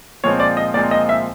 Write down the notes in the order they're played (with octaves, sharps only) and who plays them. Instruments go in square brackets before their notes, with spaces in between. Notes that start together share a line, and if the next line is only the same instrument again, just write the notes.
[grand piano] A#2 F3 G#3 C4 C#5
D5
D#5
A#2 F3 G#3 C4 D5
D#5
E5